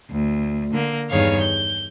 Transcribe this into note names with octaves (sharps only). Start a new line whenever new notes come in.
D2
D3 A#3
E2 G2 D#3 G#4 C#5 F5
G6